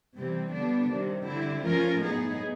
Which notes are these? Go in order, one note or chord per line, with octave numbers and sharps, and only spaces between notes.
C3 E3 G3 C4
D3 G3 B3 D4
C3 D#3 G3
D3 G3 C4 E4
F3 A3 C#4 F4 A#4
A2 F#3 B3 D#4 G#4